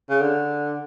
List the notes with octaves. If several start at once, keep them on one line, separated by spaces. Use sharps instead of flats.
C#3
D3